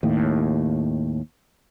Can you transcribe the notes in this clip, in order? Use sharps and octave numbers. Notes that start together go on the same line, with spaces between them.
D#2 A2